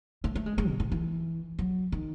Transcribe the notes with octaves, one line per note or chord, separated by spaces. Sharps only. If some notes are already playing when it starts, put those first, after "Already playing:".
A3
A3
G#3
G#3
B2
A2
E3
F#3
D#3